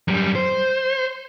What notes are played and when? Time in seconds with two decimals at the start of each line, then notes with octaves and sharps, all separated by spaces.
0.08 F#2 G3
0.35 C5